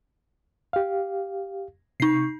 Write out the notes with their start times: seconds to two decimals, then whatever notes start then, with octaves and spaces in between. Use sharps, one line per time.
0.73 G4 F5
2.00 C3 D#4 C#6 C7